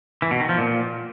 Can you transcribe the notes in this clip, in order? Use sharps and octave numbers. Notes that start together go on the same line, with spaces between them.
E3
B2
D#3
F3
A#2